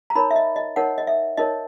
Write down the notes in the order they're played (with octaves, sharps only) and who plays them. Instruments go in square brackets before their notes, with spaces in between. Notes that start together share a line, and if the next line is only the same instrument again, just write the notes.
[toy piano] A#5
D#4 A#4 C#5 B5
E5
D#5
D#5
D#4 A#4 C#5 F#5
D#5
E5
D#4 A#4 C#5 D#5